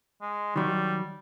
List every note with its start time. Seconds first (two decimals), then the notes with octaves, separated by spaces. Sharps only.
0.22 G#3
0.56 D#3 E3 F#3 G3